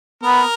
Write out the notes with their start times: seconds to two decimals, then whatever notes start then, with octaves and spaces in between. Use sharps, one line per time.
0.23 B3 A#4